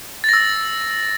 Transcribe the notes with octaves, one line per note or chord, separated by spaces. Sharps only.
E6 A6 A#6